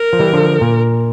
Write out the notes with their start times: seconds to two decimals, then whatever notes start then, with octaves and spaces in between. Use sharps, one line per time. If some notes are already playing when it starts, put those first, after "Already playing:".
Already playing: A#4
0.13 F3
0.19 E3 G3
0.33 D3 F3
0.61 A#2